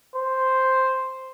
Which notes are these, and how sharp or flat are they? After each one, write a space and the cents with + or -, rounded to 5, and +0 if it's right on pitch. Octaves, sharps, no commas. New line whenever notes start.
C5 +0